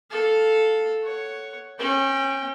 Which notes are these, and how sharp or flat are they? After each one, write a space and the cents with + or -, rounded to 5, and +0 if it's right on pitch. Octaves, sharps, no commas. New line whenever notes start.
A4 -5 F5 +10
C#5 +0 F#5 +5
C#4 -30 G5 +0